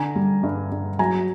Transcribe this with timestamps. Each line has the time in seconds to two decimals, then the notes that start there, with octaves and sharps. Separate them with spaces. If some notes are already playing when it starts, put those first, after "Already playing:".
Already playing: D3 G#5 A#5
0.16 G3
0.43 G2
0.72 G2
0.99 F#3 G#5 A#5